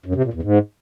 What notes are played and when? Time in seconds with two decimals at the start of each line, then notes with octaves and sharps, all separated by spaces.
0.06 F#2
0.15 C3
0.24 A#2
0.33 E2
0.43 G#2